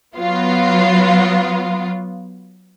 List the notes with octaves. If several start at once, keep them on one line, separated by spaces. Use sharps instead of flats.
F#3 B3 F4